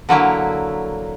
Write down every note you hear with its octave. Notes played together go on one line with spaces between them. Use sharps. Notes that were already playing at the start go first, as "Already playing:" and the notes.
D3 F#3 A#3 E4